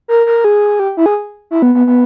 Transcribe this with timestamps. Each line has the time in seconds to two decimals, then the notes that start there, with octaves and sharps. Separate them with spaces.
0.08 A#4
0.26 A#4
0.44 G#4
0.80 G4
0.97 E4
1.06 G#4
1.51 E4
1.62 B3
1.75 B3
1.87 B3